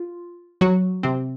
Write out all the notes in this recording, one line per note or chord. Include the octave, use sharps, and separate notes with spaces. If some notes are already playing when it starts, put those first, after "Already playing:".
Already playing: F4
F#3 F#4
C3 C4